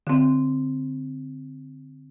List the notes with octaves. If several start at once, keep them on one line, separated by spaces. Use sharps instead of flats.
D3 C4